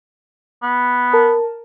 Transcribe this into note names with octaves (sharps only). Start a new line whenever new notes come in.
B3
A#4 A5